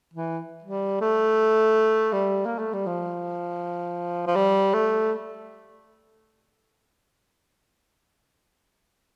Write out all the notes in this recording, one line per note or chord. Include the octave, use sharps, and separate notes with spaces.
E3
G3
A3
G3
A#3
A3
G3
F3
F3
G3
A3